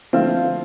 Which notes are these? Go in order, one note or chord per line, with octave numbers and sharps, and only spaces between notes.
D3 F3 A3 C4 F4